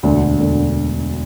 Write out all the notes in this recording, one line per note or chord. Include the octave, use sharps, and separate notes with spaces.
E1 D2 D3
E1 D2 D3